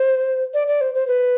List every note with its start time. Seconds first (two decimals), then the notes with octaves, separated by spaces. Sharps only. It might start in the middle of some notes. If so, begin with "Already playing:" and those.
Already playing: C5
0.54 D5
0.67 D5
0.81 C5
0.95 C5
1.07 B4